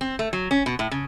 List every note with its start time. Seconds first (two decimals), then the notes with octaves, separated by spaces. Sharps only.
0.01 C4
0.19 A3
0.33 F#3
0.51 C#4
0.66 B2
0.79 A2
0.91 C#3